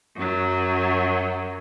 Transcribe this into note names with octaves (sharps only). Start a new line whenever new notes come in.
F#2 F#3